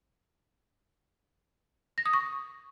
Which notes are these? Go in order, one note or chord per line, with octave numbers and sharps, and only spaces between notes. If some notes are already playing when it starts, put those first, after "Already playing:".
A#6
D#6
C#6